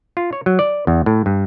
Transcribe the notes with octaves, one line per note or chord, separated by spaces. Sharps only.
F4
C#5
F#3
D5
E2
A2
G2